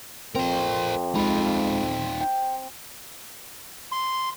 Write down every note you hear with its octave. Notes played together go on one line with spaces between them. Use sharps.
F2 C4 A#4 C5
C2 G#3 D#4 F4 B5
G5
C6